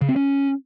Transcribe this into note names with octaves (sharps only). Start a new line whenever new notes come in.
C#3
C4
C#4